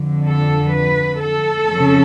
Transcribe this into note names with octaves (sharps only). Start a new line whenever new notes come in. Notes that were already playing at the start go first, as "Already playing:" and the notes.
Already playing: F2 D3
A4
B4
A4
F2 C#3